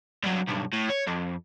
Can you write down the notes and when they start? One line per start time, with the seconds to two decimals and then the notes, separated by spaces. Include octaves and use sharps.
0.23 G2 F#3
0.47 B1 G2
0.73 A2
0.90 C#5
1.07 F2